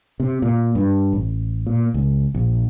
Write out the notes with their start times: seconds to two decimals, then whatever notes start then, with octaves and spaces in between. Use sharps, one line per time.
0.20 C3
0.42 A#2
0.75 G2
1.13 A1
1.67 A#2
1.94 C#2
2.34 A#1